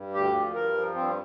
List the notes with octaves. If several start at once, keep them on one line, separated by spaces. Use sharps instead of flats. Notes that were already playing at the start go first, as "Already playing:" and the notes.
Already playing: G2
D2 G4
F3
G2 A#4
F3
G2 C4